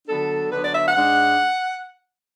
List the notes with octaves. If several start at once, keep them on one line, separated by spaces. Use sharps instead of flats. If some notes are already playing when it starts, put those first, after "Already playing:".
D3 F#3 B3 D4 A4
D3 F#3 B3 D4 B4
D5
E5
F#5
G#2 G#3 D4